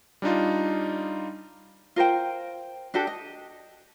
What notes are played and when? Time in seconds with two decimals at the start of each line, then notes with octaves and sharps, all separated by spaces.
0.22 G3 D4 D#4 F4
1.96 F4 A#4 C5 G5
2.94 D4 F#4 G4 A4
3.07 D#5